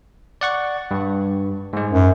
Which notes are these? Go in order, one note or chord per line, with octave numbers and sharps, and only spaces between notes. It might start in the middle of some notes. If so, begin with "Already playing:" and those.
D5 F#5 C#6
G2
G#2 G#3
F#2